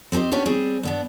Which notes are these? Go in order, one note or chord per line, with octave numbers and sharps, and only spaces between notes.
C4 G4 G#4 C5 D#5
B3 C#4 D4 G4 C#5
G3 C4 G#4
G2 B3 D4